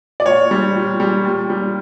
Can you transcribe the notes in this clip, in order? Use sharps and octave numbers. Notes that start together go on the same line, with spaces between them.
D5
A#2 C#5
G3
A#2
G3
A#2
G3